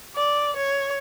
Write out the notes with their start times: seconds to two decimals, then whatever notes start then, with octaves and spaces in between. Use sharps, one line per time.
0.16 D5
0.56 C#5